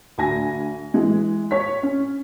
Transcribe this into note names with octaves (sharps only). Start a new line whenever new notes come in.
D2 G#5 A#6
E3 G#3
C#5 B6
C#4